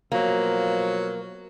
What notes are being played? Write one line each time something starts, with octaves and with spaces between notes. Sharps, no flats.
B2 F3 F#3 A#3